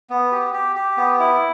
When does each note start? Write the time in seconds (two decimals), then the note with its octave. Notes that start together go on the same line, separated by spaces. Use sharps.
0.10 B3
0.32 G4
0.53 G4
0.76 G4
0.97 B3
1.20 E4